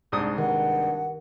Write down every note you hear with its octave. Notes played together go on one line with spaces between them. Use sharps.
C2 G#2 D4 D#6
G2 D#3 F#5